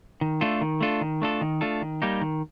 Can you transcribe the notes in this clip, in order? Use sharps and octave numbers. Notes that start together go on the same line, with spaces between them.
D#3
A3 D4 F4 A4
D#3
A3 D4 F4 A4
D#3
A3 D4 F4 A4
D#3
A3 D4 F4 A4
D#3
G3 A#3 D#4 G4
D#3